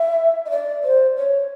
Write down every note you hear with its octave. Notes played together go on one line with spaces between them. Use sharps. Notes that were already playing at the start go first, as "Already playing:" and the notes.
Already playing: E5
D#5
D5
C5
C#5